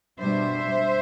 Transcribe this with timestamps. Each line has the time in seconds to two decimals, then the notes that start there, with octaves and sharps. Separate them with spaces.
0.20 B2 G3 D4 C5 E5